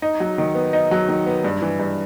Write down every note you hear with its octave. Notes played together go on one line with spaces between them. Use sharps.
D#4
F#3
D#3
B3
D#4
F#3
D#3
B3
G2
E3
G2